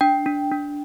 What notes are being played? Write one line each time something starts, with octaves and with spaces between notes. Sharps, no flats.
D4 G5
D4
D4